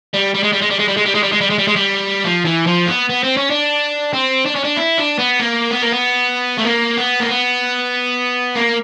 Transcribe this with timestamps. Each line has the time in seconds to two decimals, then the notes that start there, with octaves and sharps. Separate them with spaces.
0.14 G3
0.35 G3
0.43 G#3
0.53 G3
0.62 G#3
0.70 G3
0.79 G#3
0.88 G3
0.97 G#3
1.06 G3
1.15 G#3
1.23 G3
1.32 G#3
1.41 G3
1.50 G#3
1.58 G3
1.67 G#3
1.76 G3
2.24 F3
2.45 E3
2.67 F3
2.87 B3
3.09 B3
3.23 C4
3.37 C#4
3.50 D4
4.13 C4
4.45 D4
4.55 C#4
4.64 D4
4.77 E4
4.97 D4
5.18 B3
5.40 A#3
5.71 B3
5.82 A#3
5.92 B3
6.58 A3
6.66 A#3
6.97 B3
7.20 A#3
7.29 B3
8.55 A#3